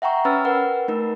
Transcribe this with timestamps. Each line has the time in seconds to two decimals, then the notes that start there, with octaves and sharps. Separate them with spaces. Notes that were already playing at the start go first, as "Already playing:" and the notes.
0.02 E5 F#5 G5 A#5 C#6
0.25 C#4 B4 B5 E6 F6 A6
0.45 A#4 B4 F#5
0.88 A3 D#4 A#4